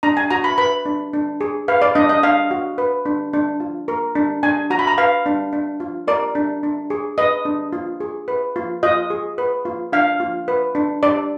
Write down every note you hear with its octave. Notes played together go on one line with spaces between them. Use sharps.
D4 A#5
G#5
F#4 A#5
B5
B4 B5
D4
D4
G#4
B4 F5
D5
D4 D#5
D#5
D4 F5
F#4
B4
D4
D4
F4
A#4
D4
D4 G#5
F#4 A#5
B5
A#5
B4 F5
D4
D4
F4
A#4 D5
D4
D4
G#4
B4 D#5
D4
F4
G#4
B4
F4
F4 D#5
G#4
B4
F4
D4 F5
F4
B4
D4
D4 D5